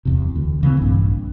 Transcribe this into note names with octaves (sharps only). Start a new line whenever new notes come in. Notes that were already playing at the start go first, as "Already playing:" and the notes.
D1 E2 C3
D2
C#3 E3 A3 C4
A#1 G2 A#2